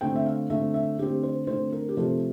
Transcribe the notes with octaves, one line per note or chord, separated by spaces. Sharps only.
D3 A3 C4 G5
E5
F5
D3 A3 C4 E5
E5
D3 A3 C4 G4
C5
D3 A3 C4 C5
A#4
G4
C3 F3 A3 C4 A4